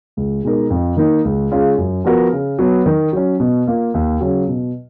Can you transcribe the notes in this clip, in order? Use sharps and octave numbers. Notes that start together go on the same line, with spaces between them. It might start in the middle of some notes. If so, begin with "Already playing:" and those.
C#2
B2 G#3 D#4 A#4
F2
D#3 A#3 D#4
C#2
C#3 G#3 C#4 F4
F#2
F3 B3 F#4 A#4
C#3
F#3 B3
D#3
F#3 C#4
B2
A#3 F4
D#2
C#3 F#3 C#4
B2